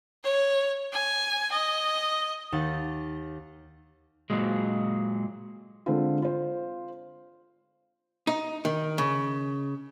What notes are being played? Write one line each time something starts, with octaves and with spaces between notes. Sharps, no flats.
C#5
G#5
D#5
D#2 D#3 F#5 A6
A#2 F#3 G#3
D3 G#3 C4 F4
F4 C5
D#4
D#3
C#3